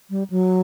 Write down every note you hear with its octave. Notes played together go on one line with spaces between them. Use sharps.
G3
F#3